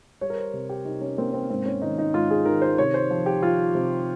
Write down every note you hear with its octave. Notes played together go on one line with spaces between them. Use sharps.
G3 C#5
A#4
C5
C3
G4
C3 D#4
C#4
A#3 C4
C4
G#2 C4
C#4
D#3 D#4
D#4
G#2 F4
G#4
D#3 A#4
C5
C3 C#5
C5
F3
G4
F3 F4
C3